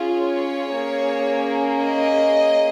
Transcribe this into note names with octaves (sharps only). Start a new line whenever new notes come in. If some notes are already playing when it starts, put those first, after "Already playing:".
Already playing: C#4 F4 G#4
C#5
A#3 C#4 G#4
D#5